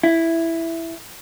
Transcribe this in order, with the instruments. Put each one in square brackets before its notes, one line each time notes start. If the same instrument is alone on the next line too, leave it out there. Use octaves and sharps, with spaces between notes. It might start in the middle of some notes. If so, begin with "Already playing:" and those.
[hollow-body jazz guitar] E4